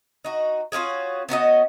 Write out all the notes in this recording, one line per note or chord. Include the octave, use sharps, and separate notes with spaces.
D#4 F#4
C#4 F4 F#4 G#4
B3 C#4 F#4 D#5